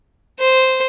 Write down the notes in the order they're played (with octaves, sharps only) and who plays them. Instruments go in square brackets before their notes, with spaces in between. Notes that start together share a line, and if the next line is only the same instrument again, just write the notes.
[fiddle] C5